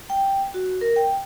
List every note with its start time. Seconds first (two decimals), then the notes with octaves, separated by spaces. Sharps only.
0.10 G5
0.54 F#4
0.81 A#4
0.96 G5